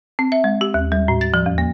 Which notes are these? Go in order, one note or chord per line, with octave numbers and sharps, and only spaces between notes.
C4
E5
G#3
G4
D#2
G3
A2
A6
F3
E2
A#3